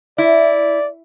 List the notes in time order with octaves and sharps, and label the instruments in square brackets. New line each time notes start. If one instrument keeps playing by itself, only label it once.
[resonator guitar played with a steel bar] E4 [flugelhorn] D5